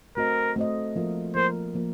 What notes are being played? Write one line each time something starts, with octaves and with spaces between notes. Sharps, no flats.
A3 C4 F#4 A#4 C5 D#5
A3 C4 F#4 C5 D#5
F3 A#3 F4 A#4
F3 A#3 F4 A#4 C5
F3 A#3 F4 A#4